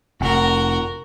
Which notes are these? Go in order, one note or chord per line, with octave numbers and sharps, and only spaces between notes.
F1 F#4 A#4